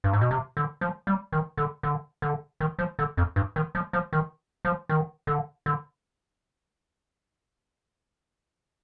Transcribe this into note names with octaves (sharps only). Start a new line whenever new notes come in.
G2
G#2
B2
C3
D3
F3
G3
D#3
D3
D3
D3
D#3
F3
D3
F2
G2
D#3
F3
F3
D#3
F3
D#3
D3
D3